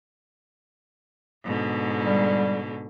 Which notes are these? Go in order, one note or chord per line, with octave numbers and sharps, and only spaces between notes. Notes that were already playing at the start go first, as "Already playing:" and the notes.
G#2 B2 D3
G3